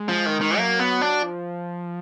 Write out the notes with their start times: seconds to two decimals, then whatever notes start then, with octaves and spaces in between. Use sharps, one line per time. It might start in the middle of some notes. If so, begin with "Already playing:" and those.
Already playing: G#3
0.09 F3
0.26 D#3
0.41 D#3
0.58 F#3 A#3
0.79 B3
1.01 D4
1.22 F3